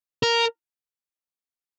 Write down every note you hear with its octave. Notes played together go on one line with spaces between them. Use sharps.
A#4